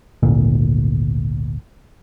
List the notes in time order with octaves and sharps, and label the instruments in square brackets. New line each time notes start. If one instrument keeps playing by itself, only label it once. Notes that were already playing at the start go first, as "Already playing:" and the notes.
[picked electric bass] G#1 D2 A#2